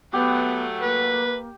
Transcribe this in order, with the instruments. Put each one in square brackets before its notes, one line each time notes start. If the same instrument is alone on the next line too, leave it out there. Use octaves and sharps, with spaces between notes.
[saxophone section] F#3 A3 [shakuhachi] B3 [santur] G4
[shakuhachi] A#3 [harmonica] B4